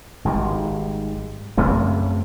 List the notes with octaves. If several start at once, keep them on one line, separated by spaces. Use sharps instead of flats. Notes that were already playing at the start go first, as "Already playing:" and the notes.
G#1 D#3 G3 G#3
F#2 C#3 A3 C4